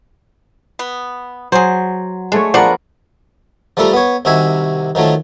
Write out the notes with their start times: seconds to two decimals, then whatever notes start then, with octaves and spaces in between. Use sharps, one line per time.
0.79 B3
1.52 F#3 G#4 C5
2.32 G#3 A3 D4 C#5
2.54 F3 B3 D4 A#4 D5 F#5
3.77 F3 G3 A3 A4 A#4
3.93 B3 C#5
4.25 C2 C3 D#3 F#4 E5 G#5
4.95 D#3 F3 F#3 A3